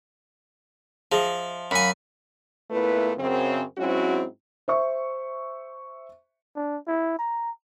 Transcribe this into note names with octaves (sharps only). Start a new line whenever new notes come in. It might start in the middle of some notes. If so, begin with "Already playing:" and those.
F3 G#4 D#5 E5
F#2 F5 G#5 B5
A#2 A3 B3 E4 B4
F#2 C#3 C4
G#2 F#3 C4 C#4 E4 F#4
C5 E5 C#6
D4
E4
A#5